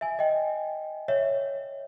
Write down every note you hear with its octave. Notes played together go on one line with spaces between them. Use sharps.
E5 G#5
D#5 G5
C#5 E5